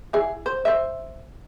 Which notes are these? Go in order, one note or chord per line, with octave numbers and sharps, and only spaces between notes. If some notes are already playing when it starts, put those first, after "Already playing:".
E4 G#4
C5
C5 E5